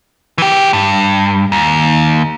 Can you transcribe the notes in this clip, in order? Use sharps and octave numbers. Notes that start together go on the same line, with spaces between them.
E3 G4
G2
D#2